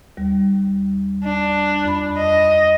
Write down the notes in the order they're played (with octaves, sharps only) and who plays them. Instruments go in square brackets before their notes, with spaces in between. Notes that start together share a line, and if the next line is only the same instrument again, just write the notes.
[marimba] D#2 G3
[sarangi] D4
[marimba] F2 B5
[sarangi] D#5